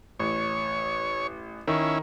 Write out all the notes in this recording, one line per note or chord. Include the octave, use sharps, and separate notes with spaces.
A1 C#5
D#3 C#4 E4